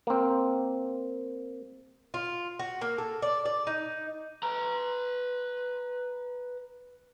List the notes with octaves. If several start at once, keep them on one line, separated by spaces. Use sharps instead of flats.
A#3 C4
F4
F#4
A#3
A4
D5
D5
D#4
B4 A#5